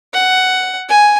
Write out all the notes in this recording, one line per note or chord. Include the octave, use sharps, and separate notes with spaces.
F#5
G#5